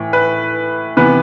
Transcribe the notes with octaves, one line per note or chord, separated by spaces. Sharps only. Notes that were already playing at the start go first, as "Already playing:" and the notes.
Already playing: A2 E3
B4
C3 E3 B3 B4